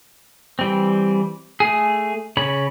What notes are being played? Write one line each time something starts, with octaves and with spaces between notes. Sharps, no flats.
E3 G3 C4
A3 G#4
C#3 C#5 B5